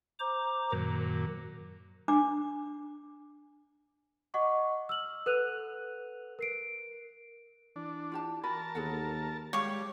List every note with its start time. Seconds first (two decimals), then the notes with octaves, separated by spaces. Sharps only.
0.19 C5 A#5 D6
0.72 F#2 A#2 D#3
2.08 D4 D6
4.34 D#5 F#5 C#6 D6
4.89 E6 F6 F#7
5.26 A4 B4 F#5 F#6 D#7 F7
6.39 A#4 C7 D7
7.76 E3 D4
8.12 F4 G4 A5
8.44 F#4 A#4 G#5 A5 B5
8.75 D#2 G#4 A4 F#5
9.53 G3 G#3 F#4 C#5 F5 D6